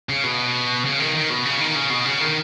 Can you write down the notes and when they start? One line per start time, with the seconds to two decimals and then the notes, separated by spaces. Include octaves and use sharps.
0.09 C#3
0.23 B2
0.85 C#3
1.00 D#3
1.15 D#3
1.30 B2
1.45 C#3
1.61 D#3
1.75 C#3
1.90 B2
2.05 C#3
2.21 D#3